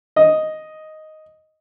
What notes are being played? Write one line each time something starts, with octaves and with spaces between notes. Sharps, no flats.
D#5